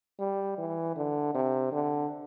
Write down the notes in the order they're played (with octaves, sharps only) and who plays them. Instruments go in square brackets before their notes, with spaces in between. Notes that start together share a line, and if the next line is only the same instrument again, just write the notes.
[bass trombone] G3
E3
D3
C3
D3